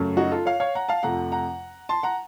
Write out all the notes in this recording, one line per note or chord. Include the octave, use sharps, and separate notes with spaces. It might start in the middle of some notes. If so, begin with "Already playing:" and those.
Already playing: F#2 C#3 F#3 A3
D#4 F#4
F4 A4
C#5 F5
C#5 F5
F#5 A#5
F5 A5
F2 C3 F3 A3 F#5 A#5
F#5 A#5
A5 C6
F#5 A#5